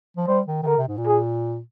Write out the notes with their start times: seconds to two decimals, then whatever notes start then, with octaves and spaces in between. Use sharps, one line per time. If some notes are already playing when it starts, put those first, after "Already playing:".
0.17 F3
0.28 G3 C5
0.47 D#3
0.63 D#3
0.67 D3 A#4
0.77 C3
0.88 G#2
0.97 A#2
1.07 G#4